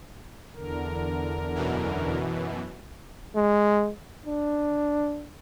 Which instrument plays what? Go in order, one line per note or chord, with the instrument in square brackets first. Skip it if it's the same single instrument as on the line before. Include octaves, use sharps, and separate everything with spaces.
[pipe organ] E2 D3 A#4
[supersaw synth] F#2 B2 E3
[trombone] G#3
D4